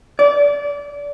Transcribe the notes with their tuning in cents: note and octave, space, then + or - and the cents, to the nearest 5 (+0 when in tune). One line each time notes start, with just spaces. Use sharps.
D5 -25